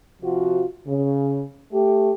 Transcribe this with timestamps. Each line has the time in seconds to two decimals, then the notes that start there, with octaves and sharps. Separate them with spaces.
0.22 C3 F3 F4 F#4
0.87 C#3
1.72 A3 G4